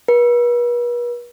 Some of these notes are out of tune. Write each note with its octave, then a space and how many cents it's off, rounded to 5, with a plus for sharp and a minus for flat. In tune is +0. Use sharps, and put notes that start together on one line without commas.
B4 -40